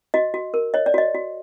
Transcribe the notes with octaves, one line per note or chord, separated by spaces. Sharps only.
F#4 D#5
F#4
A#4
C#5 D#5
D5
F#4 D#5
F#4